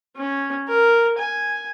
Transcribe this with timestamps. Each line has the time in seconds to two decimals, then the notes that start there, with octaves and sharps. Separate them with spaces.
0.16 C#4
0.67 A#4
1.18 G#5